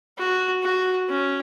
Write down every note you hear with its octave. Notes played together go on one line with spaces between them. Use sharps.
F#4
F#4
C#4